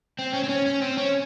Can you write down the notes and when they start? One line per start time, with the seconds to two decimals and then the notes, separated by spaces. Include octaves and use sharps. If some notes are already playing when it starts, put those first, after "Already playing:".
0.19 C4
0.34 C#4
0.44 C4
0.49 C#4
0.66 C#4
0.82 C4
0.98 C#4